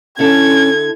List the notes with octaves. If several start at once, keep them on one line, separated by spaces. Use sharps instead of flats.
D3 C#4 E4 A4 G#6